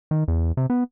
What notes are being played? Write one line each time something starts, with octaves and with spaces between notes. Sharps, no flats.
D#3
E2
C3
B3